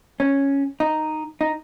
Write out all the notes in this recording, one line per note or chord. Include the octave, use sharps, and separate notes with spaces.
C#4
D#4
D#4